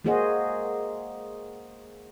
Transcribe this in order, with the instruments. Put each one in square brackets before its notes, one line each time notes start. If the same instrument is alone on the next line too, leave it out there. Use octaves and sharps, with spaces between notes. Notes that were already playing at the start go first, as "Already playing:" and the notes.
[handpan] G#3 A#3 F#4 G#4 C5 D#5